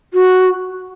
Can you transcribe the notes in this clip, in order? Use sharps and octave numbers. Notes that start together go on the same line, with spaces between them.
F#4